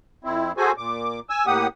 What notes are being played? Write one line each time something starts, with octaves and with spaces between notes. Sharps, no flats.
F2 C4 E4
F#4 G#4 A4 C5 G#5
A#2 D6
G#5 E6
A2 A#3 G4 F#5 D#6